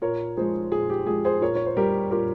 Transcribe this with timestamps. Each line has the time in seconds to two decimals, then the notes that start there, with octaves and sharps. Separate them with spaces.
0.02 A#2 A#4 C#5
0.37 F3 G#3 G#4 C5
0.71 A#2 G#4
0.90 G4
1.06 F3 G#3 G#4
1.25 G#4 C5
1.41 A#2 A#4 C#5
1.55 C#5
1.66 C5
1.77 G3 G4 A#4
2.11 A#2 G4 A#4